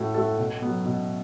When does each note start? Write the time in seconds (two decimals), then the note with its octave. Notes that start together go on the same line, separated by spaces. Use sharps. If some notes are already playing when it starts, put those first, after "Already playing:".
Already playing: A2 A3 F#4 A4
0.14 A3 F#4 A4
0.38 B2
0.62 F#3 B3
0.86 B2